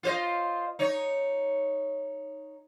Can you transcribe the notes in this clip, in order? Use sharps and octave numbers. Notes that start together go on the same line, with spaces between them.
F4 C5 D#5
D#4 C#5